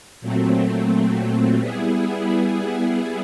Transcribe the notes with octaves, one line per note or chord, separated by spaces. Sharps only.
A#2 F#3 A3 C4
G3 B3 E4 G#4